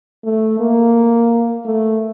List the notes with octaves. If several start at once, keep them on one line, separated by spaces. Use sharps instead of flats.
A3
A#3
A3